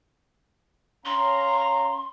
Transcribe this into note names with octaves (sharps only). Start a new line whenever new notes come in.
C#4 F5 A#5 C6